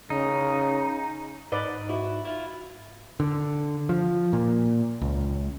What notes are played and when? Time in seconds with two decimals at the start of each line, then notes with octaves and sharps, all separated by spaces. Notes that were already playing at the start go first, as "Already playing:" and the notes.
0.10 C#3 D#4
1.52 G#2 B4 D5 D#5
1.90 E4 F#4
2.25 E4 F4
3.20 D3
3.89 F3
4.33 A#2
5.01 C#2